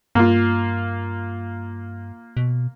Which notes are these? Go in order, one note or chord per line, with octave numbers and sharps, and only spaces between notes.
G2 A#3 F4
B2